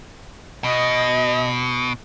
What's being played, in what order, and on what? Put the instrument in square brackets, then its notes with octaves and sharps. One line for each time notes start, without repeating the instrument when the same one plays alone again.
[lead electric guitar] B2 [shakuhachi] D#5